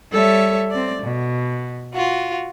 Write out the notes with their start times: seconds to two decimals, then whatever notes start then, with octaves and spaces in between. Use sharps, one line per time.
0.12 G3 A4 C#5 E5
0.71 C4 D5
1.02 B2
1.94 F4 F#4